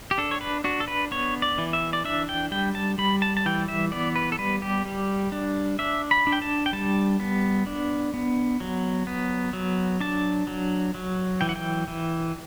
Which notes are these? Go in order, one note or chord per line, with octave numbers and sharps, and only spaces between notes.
G4
D4 A4
C#5
B4
D4 F#4
A4
B4
B3 C#5
D5
E3
E5
D5
D4 E5
G5
G3 G5
A5
G3 B5
A5
A5
E3 G5
E5
B3 D5
B4
A4
G3 B4
G4
G3
D4
D4 E5
B5
D4
G5
A5
G5
G3 A5
B3
D4
B3
F#3
B3
F#3
D4 A5
F#3
F#3
E3 G5
F#5
G5
E3